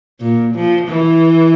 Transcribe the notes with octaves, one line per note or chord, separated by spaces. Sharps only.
A#2
F3
E3